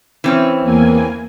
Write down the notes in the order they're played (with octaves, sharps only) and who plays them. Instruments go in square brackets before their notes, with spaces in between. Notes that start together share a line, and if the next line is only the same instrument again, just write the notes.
[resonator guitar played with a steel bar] E3 C4 C#4
[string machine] E2 A#3 G#5